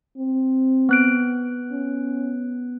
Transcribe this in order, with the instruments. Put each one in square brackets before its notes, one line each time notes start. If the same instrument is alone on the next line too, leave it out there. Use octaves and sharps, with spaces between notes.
[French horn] C4
[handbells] B3 F#6 D7
[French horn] C#4